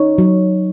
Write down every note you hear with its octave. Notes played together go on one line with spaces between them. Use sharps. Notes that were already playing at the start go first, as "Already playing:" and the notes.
Already playing: D#4 C#5
F#3